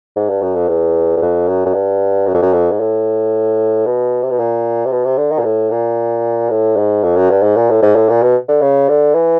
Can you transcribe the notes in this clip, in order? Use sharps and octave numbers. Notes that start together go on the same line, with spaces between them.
G#2
G2
F#2
F2
E2
E2
F2
F#2
F#2
G2
F#2
F2
F#2
F2
G#2
A2
B2
C3
B2
A#2
C3
B2
C3
D3
D#3
A#2
A2
A#2
A2
G#2
F2
F#2
G2
G#2
A#2
A2
G#2
A2
A#2
B2
D3
C#3
D3
E3